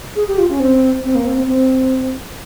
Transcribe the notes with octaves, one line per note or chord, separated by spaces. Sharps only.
G#4
G4
F4
C#4
C4
C4
A#3
C4
C4
C4